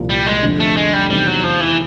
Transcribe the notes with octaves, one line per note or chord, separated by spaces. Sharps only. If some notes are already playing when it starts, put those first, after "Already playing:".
Already playing: C2 A#2 F3 A#3
G3
G#3
F1 F2 D3
A3
G#3
G3
E2 C3 D#3 G3
F#3
F3
E3